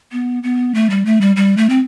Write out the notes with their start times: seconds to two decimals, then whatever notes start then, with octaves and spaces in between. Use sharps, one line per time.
0.12 B3
0.43 B3
0.74 A3
0.90 G3
1.05 A3
1.21 G3
1.36 G3
1.57 A3
1.69 C4